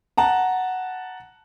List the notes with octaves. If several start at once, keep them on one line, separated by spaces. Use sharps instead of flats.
F#5 A5 A#5